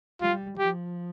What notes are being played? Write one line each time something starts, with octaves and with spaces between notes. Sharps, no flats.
G3 F4
F3 G4